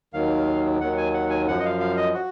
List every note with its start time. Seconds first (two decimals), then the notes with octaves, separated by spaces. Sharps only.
0.14 D#2 D#3 F#3 F5
0.81 D#2 D#3 F#3 F#5
0.97 G#5
1.14 F#5
1.30 G#5
1.47 F#2 F3 F#5
1.59 D#5
1.65 F5
1.80 F5
1.97 D#5
2.14 F#4